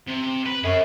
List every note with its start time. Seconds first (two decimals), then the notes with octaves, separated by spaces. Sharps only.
0.07 C3
0.46 B4
0.64 F#2 G#4 C#5